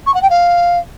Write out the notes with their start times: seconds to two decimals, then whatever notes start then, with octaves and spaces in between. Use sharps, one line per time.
0.06 C#6
0.14 F#5
0.22 G5
0.30 F5